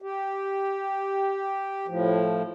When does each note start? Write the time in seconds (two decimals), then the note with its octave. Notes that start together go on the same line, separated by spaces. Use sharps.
0.02 G4
1.88 A2 F3